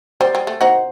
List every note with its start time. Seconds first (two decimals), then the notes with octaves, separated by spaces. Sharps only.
0.20 G3 C5
0.35 G3
0.47 A3
0.61 D#4 F#4 C5